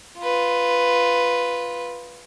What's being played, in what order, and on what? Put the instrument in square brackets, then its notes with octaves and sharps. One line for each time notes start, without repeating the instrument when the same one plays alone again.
[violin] F4 B4